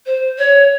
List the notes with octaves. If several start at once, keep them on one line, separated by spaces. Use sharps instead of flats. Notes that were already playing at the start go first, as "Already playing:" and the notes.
C5
C#5